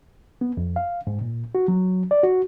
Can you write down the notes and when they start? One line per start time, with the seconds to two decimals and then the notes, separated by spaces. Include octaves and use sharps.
0.41 B3
0.57 F2
0.76 F5
1.07 G#2
1.21 A#2
1.55 F#4
1.68 F#3
2.11 D5
2.23 F#4